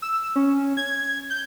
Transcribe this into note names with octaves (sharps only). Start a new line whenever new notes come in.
E6
C#4
G#6
G6